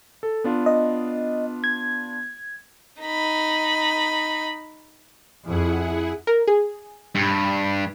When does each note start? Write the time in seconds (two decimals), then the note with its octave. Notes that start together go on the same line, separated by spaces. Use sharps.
0.23 A4
0.44 B3 D4 F4
0.66 D#5
1.64 G#6
3.02 D#4 B5
5.45 F2 E4 G#4 F#5
6.27 A#4
6.47 G#4
7.15 G2